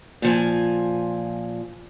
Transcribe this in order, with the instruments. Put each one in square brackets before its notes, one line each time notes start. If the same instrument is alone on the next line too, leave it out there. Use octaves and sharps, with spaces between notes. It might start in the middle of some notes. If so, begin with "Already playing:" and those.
[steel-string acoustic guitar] A#2 F3 G#5